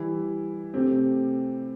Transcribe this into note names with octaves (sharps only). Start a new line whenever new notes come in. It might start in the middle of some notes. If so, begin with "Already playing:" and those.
Already playing: E3 G3 E4
C3 A3 C4 G4